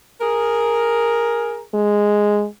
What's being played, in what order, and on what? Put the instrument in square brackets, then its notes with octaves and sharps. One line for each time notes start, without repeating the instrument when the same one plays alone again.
[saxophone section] G#4 A#4
[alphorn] G#3